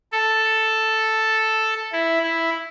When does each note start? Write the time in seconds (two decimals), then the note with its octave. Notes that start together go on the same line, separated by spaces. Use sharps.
0.12 A4
1.92 E4
2.22 E4